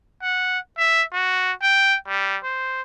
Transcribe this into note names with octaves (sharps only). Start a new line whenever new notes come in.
F#5
E5
F#4
G5
G3
C5